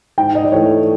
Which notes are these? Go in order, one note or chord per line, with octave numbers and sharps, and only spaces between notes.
G#2 G5
D#5
D5
E3 A3 C#5